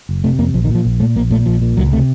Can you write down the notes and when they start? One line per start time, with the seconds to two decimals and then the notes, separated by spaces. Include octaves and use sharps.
0.09 F#1
0.24 C3 A3
0.39 F2 A#3
0.54 A#1 F3
0.64 D#3
0.70 A#2
0.75 F3
0.85 A#1
1.00 A#2 A3
1.16 A#1 A#3
1.31 A#2 A3
1.46 A#1 F3
1.61 A#2
1.77 C#2 F#3
1.93 C3 A3